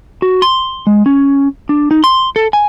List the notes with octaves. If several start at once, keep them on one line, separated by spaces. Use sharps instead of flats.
F#4
C6
G#3
C#4
D4
D#4
C6
A4
G#5